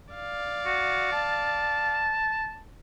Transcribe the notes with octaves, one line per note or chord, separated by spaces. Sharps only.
D5 F5
F#4
A5